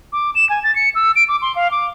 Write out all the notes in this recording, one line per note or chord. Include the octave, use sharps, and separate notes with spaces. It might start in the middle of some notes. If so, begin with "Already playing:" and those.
D6
E7
G#5
A6
C#7
E6
D7
D6
C6
F5
D6